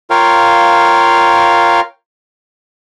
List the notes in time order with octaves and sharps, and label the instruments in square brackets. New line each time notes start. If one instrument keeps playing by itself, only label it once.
[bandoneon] F4 A#4 C#5 F5 G5